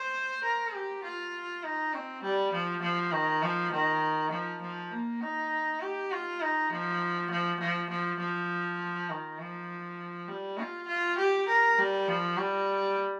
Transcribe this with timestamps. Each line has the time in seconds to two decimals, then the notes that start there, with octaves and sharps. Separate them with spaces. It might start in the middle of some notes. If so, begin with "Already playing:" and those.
Already playing: C5
0.44 A#4
0.74 G4
1.04 F4
1.63 D#4
1.94 C4
2.23 G3
2.53 F3
2.82 F3
3.12 D#3
3.43 F3
3.72 D#3
4.32 F3
4.62 F3
4.91 A#3
5.21 D#4
5.81 G4
6.11 F4
6.41 D#4
6.70 F3
7.30 F3
7.60 F3
7.90 F3
8.20 F3
9.10 D#3
9.39 F3
10.28 G3
10.59 F4
10.88 F4
11.18 G4
11.48 A#4
11.78 G3
12.08 F3
12.37 G3